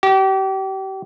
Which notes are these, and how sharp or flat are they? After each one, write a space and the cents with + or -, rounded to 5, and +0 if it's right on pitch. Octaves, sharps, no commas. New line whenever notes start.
G4 -35